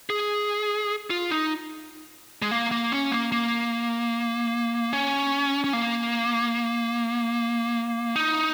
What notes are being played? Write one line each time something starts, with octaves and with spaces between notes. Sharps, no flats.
G#4
F4
D#4
G#3
A#3
A#3
C#4
A#3
A#3
C#4
C#4
A#3
D#4